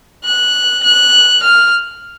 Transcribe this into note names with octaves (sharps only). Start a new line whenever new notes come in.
F#6
F#6
F6